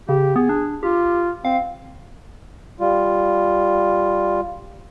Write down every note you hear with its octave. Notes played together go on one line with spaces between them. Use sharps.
C#3 G4
B3 G#4
D4
F4 G4
C4 F5
G3 F4